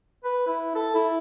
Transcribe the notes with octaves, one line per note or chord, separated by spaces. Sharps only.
B4
E4
A4
E4